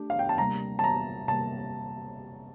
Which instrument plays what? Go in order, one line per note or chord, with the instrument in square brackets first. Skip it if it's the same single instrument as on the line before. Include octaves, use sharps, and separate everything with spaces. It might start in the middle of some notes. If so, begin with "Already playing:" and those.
Already playing: [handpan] A3 D4 G4
[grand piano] F5
G5
A5
[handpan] C3 G3 A#3 [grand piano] A#5
[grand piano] A5
A#5
[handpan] C3 G3 A#3 [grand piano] A5